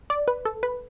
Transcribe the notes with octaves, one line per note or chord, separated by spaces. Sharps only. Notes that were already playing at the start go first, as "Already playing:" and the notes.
D5
B4
A4
B4